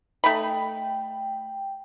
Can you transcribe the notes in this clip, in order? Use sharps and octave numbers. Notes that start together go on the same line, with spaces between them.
A3 D#4 G5 B5